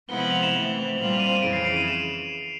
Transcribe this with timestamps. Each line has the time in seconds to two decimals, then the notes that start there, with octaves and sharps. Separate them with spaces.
0.09 C3 F3 G#3 B3 E4 G7
0.20 F#7
0.31 F7
0.43 E7
0.54 E3 A3 C4
0.98 A#2 G3 C4 F4 F#7
1.09 F7
1.20 D#7
1.32 D#7
1.42 F2 C#3 E3 D7
1.53 C7
1.64 C7
1.76 D#7
1.88 E7